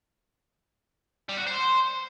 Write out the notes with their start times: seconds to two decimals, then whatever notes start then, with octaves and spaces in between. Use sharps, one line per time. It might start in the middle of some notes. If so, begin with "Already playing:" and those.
1.29 G3
1.38 F#4
1.47 C5